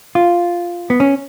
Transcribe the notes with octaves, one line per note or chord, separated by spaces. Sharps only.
F4
B3
C#4